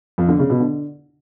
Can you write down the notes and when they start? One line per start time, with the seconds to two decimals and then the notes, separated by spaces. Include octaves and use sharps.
0.18 F2
0.29 D3
0.39 C#3
0.50 B2
0.60 D3